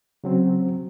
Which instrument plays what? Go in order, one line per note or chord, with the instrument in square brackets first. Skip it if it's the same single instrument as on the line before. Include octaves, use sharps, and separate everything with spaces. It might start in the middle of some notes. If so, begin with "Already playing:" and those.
[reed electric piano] C#3 F#3 C4